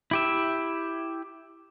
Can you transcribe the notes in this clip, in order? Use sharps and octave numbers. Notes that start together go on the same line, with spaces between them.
E4 G4 E5